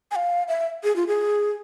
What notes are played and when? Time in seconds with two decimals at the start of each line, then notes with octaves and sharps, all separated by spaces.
0.11 G#5
0.16 F5
0.48 E5
0.84 G#4
0.96 F4
1.07 G#4